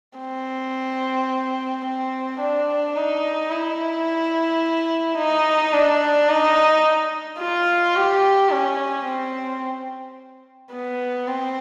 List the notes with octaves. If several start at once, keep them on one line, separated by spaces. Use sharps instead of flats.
C4
C4
D4
D#4
E4
D#4
D4
D#4
F4
G4
C#4
C4
B3
C4